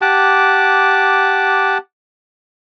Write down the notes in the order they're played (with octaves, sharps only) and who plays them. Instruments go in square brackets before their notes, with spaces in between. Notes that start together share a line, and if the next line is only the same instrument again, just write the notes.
[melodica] G4 F#5 A5 D6